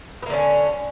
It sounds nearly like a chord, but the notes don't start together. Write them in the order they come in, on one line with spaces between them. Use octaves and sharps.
B3 A#3 D3 C#4